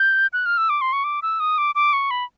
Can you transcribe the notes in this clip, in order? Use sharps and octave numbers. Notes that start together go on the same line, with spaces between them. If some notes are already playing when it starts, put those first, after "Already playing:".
Already playing: G6
F#6
F6
E6
D6
C6
C#6
D6
E6
D#6
D6
D6
C#6
B5